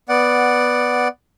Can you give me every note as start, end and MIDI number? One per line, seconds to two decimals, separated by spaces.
0.09 1.08 59
0.09 1.08 74
0.09 1.08 78